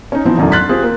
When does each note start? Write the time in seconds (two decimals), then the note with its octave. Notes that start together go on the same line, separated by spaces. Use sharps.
0.12 C#4 D#4
0.25 E3 F3 B3 C4 D#4
0.38 E1 F#2 A2 D3
0.52 C6 F#6 A6 B6
0.69 C4 F4 G4 G#4 C5
0.83 A#3